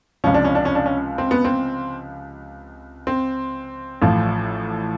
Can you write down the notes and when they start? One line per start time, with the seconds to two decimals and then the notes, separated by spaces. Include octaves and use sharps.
0.24 C#2 C3 F3 C#4
0.34 D4
0.45 C#4
0.55 D4
0.65 C#4
0.75 D4
0.86 C#4
1.18 C4
1.31 B3
1.45 C4
3.07 C4
4.02 A1 A2 F3